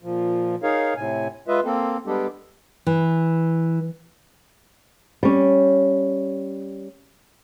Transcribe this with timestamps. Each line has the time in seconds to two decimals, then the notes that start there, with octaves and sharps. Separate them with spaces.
0.03 A#2 F3
0.63 D#4 G#4 A#4 C#5 F5
0.96 A2 C3 G#5
1.48 G#3 F4 B4 D#5 E5
1.65 A#3 C4 A4
2.06 G3 G#3 B3 D4 G4 A4
2.87 E3
5.23 G3 C#4